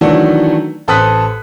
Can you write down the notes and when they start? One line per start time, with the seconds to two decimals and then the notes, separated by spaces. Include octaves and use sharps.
0.01 D#3 E3 F#3 A3 D4 F#4
0.88 A1 A4 C5 D#6 F#6 B6